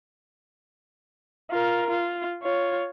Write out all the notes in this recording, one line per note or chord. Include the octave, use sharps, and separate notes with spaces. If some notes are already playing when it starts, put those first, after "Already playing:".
F4 A#4
F4
F4 C#5